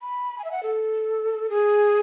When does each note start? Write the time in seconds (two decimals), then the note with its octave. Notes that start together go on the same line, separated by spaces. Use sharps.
0.02 B5
0.38 G#5
0.44 E5
0.52 F#5
0.63 A4
1.50 G#4